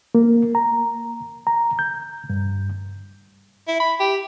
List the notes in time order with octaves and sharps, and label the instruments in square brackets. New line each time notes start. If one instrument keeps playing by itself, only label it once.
[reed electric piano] A#3
A#5
A#5
G6
G2
[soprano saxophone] E4
B5
G4